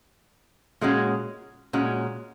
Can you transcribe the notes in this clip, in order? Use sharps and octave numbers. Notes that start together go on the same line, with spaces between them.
A#2 G#3 C#4 F#4
A#2 G#3 C#4 F#4